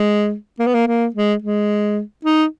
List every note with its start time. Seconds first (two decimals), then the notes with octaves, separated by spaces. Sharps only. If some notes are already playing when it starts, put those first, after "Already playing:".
Already playing: G#3
0.59 A#3
0.67 B3
0.74 A#3
0.87 A#3
1.15 G#3
1.42 G#3
2.25 D#4